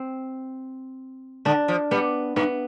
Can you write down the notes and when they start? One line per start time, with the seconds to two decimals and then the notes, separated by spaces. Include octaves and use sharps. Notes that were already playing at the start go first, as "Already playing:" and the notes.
Already playing: C4
1.45 D3 D4
1.68 F3
1.91 G3 B3
2.36 G2 B3